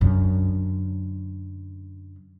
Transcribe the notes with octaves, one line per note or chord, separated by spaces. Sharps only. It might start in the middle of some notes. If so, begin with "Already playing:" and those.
F#2 D3